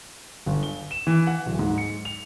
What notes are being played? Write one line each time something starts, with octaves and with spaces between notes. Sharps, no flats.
G1
G7
E7
E3
F#5
D1
G#2
C#7
F7